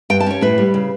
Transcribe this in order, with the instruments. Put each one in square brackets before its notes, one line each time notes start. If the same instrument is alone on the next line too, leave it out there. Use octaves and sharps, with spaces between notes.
[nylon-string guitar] G2 G5
A5
C#4 C#5
A2 B4
G3
C#3